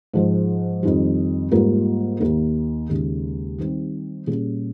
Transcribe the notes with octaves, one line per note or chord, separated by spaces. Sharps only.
G#2 F3 G#3
F2 D#3 G3
G#2 G3 A#3 F4 A#4
D#2 D#3 A#3
D#2 C#3 G#3
D#3 G3 C4
A#2 G3 C#4 G#4